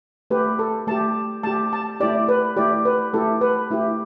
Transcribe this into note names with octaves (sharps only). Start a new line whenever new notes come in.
A3 G4 B4
A4
A3 G4 A5
A3 G4 A5
A5
A3 E4 G4 D5
B4
A3 E4 G4 D5
B4
A3 E4 G4 A4
B4
A3 E4 G4